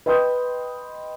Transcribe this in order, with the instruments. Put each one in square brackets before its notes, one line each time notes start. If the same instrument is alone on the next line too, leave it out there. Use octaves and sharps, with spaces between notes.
[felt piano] B4 D#5 G5 C6 D#6 G6